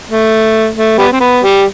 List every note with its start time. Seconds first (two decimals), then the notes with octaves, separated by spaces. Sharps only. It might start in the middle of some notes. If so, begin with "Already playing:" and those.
0.10 A3
0.76 A3
0.98 G3 B3
1.12 C4
1.20 B3
1.43 G3